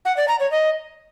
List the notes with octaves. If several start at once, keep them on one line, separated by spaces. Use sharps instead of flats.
F#5
D5
A#5
C#5
D#5